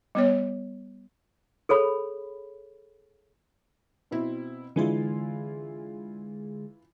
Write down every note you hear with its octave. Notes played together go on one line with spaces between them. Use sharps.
G3 B3 C#5
G#4 A4 C#5 B5
B2 C4 E4
D3 E3 G#3 E4 F4 G#4